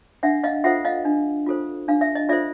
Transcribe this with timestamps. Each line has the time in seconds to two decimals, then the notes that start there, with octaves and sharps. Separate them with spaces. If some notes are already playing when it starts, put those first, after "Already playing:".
0.23 D4 E5 F#5
0.43 D#5 F5
0.64 F4 A4 C5 E5 F#5
0.85 D#5 F5
1.05 D4
1.46 F4 A4 C5
1.88 D4 F5
2.01 E5
2.15 D#5
2.29 F4 A4 C5 D5 E5